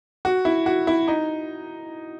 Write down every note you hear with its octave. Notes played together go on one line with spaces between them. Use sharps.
F#4
E4
F#4
E4
D#4